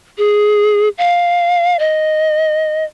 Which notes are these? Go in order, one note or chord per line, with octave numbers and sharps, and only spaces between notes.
G#4
F5
D#5